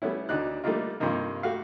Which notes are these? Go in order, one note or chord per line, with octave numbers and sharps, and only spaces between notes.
G3 A3 B3 C#4 E4
D2 D4 D#4 F#6
G3 A3 A#3 D4 D#4 F4
G2 C3 F3 A#3 D#4
A3 F#4 G4 F5